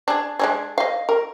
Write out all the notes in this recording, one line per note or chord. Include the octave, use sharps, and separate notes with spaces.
D4 G#4
G#3 D4 G#4
D#5 F5
A#4